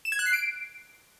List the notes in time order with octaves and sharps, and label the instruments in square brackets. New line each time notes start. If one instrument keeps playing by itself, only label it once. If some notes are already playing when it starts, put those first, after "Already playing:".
[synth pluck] E7
G#6
F#6
C7
D7